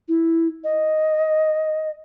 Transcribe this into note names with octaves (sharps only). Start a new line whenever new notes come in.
E4
D#5